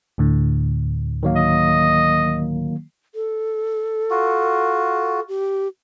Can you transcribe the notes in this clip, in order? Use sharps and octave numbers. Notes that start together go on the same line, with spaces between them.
D2 A2 D3
D#3 F#3 A#3
D#5
A4
F4 F#4
G4